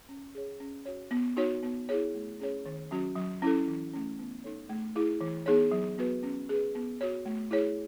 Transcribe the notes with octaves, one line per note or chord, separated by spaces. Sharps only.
C#4
G#4 C#5
C#4
F#4 C#5
B3
D#4 F#4 C#5
B3
E4 G#4 C#5
A3
C#4 G#4 C#5
D#3
F#3 C#4 F#4
F#3
C#4 E4 A4
E3
A3 C#4
B3
D#4 A4 C#5
A3
E4 G#4
E3
B3 D#4 G#4 C#5
F#3
B3 F#4 B4
C#4
G#4 B4
B3
F#4 C#5
A3
E4 G#4 C#5